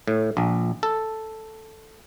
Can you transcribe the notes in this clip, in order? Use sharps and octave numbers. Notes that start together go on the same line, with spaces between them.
A2
A#1
A4